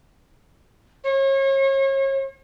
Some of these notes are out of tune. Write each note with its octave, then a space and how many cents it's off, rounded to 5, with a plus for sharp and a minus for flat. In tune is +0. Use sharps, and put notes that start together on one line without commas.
C#5 -35